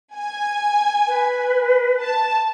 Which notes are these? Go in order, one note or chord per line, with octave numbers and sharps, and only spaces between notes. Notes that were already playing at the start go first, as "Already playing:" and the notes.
G#5
B4
A5